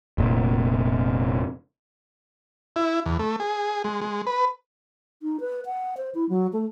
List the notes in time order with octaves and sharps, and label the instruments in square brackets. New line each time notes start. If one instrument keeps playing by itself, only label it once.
[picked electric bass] F1 A#2
[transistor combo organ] E4
E2
A3
G#4
G#3
G#3
B4
[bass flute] D#4
B4
F#5
C5
E4
F#3
A3